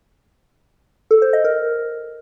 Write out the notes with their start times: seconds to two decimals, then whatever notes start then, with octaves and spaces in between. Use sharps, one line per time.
1.11 A4
1.22 C5
1.33 D#5
1.44 A#4